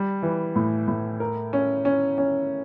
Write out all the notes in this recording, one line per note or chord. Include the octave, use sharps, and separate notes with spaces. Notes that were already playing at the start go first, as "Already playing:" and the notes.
Already playing: G3
E3
A2
A2
A#4
C#4
C#4
C#4